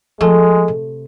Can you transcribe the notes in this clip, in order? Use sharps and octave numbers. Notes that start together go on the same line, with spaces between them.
F3 G#3 A3
C3